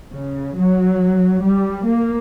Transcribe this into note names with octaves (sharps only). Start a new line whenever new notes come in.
C#3
F#3
G3
A#3